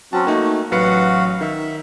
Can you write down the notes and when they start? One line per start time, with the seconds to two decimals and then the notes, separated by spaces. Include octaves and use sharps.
0.13 F#3 C4 C#4 F#4 A5
0.27 A3 A#3 D#4
0.72 A1 F#3 F#4 B4 F5 F#5 C#7
1.41 D#3 E5